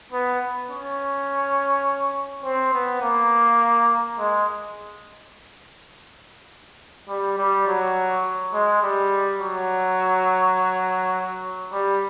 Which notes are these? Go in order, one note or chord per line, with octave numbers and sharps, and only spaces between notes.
B3
C#4
C4
B3
A#3
G#3
G3
G3
F#3
G#3
G3
F#3
G3